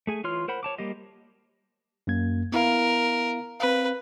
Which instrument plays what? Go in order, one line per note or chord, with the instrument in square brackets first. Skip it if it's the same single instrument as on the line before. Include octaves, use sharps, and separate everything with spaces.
[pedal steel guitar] A3 G#4 G#5
E3 F4 C#5 C6 F6
A#4 C5 F#5 B5
C#5 A5 D6
G3 A#3 G4 D#5
[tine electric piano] F#2 A#3 G#6
[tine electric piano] B3 E4 F5 [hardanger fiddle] A#4
[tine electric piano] C4 F5 [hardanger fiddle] B4